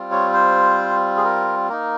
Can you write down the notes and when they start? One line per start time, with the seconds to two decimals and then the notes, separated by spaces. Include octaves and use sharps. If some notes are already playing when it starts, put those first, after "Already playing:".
Already playing: G3 C4 F4
0.11 C#5
0.33 C5
1.17 G#4
1.24 A#4
1.69 A#3 D#4 A#4